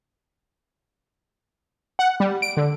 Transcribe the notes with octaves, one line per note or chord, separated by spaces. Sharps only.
F#5
G3
D7
D3